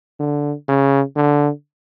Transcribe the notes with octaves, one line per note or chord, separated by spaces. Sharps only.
D3
C#3
D3